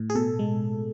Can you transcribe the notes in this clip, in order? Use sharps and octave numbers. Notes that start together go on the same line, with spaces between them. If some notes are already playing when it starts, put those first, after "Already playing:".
Already playing: A2
G#4
B2 A4
G#3